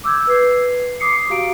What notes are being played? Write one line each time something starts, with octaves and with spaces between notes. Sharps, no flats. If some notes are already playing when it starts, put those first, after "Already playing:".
D6 E6 G6 G#6
B4 G#6 C7
D6 D#6 C7 C#7
F#4 G4 F5 A#5 D7